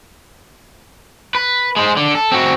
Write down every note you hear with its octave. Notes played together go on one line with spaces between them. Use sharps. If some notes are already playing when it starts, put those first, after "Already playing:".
B4
G#3 C5
D3
A4
C4 F#4